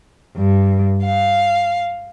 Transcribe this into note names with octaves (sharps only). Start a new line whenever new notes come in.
G2
F5